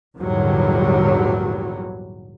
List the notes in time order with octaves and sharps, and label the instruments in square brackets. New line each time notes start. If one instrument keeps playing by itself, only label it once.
[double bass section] A#1 E2 G#2 D3 F#3 G3